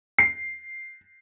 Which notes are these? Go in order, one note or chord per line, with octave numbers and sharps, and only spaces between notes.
C7